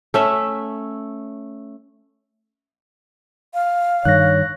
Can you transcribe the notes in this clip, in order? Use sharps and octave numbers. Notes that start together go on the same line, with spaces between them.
A3 C#4 E5
F5
G2 D#3 C#5 F#6 A#6